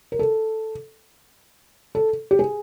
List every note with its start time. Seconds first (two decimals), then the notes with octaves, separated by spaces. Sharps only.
0.12 A#4
0.19 A4
1.95 A4
2.31 G4
2.39 G#4